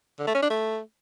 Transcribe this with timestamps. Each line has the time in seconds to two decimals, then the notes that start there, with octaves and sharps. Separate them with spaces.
0.19 D3
0.27 A3
0.35 C#4
0.42 D4
0.50 A3